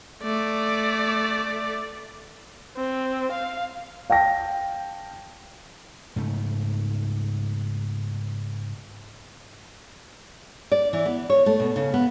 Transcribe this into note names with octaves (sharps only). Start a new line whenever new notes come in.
A3 D5
C4
F5
F5 G5 A5 A#6
G#2 C#3 A3
D5
E3
B3
C#5
A3
B2
C#3
B3